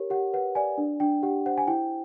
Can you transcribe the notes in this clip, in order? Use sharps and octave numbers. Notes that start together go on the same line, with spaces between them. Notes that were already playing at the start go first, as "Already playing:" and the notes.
Already playing: G4 A#4 C#5
G4 F#5
B4 F#5
D5 G#5
D4
D4 G5
G4 F#5
C5 F#5
G#5
E4 G5